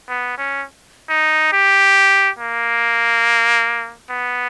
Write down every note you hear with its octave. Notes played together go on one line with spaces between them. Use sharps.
B3
C#4
D#4
G4
A#3
B3